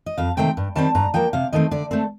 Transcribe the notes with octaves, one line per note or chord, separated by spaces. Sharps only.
D#5
F2 F5
C3 D#3 A3 C4 G5
G2
D#3 G3 C4 A5
G2 A#5
F3 A#3 G5
C3 F5
D#3 A3 C4 D#5
D3 D5
A3 C4 A4